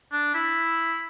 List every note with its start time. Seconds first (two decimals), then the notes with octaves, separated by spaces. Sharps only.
0.12 D4
0.34 E4